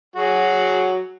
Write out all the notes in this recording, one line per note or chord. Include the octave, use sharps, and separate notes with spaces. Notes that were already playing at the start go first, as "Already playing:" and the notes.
F#3 F#4 G#4